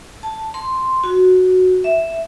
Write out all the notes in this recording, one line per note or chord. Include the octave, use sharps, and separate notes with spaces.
A5
C6
F#4
E5